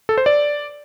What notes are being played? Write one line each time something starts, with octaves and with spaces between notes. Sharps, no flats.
A4
C5
D5